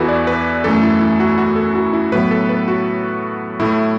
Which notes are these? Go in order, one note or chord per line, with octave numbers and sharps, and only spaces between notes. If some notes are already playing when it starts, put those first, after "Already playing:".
Already playing: E2 E3 B3 E4 F#4 A4 B4
D5
B4
F#2 E3 A3 A4
E4
E4
F#4
F#4
A4
F#4
E4
A2 F#3 B3 B4
A4
B4
F#4
A2 A3 E4